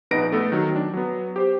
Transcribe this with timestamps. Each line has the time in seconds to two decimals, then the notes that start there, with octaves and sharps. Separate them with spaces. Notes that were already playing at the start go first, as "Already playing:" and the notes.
0.11 A#1 B3 D#4 B4 A#6 D7
0.32 A3 B3 A4
0.52 D#3 F#3
0.76 D4
0.94 F#3 B3
1.36 G4 C5